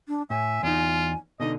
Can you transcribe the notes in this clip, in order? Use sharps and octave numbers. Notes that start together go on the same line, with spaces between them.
D4
A2 E5 G#5
E2 D#4 F4
B2 D3 D#4 D#5